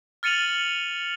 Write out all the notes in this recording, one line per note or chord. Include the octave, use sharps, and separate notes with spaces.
F6 A6 C#7 D#7 F7 F#7